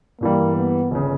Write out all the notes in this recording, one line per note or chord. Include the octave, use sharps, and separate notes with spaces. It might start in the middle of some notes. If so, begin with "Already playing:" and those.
G2 E3 G3 A#3
B3
G1 C#3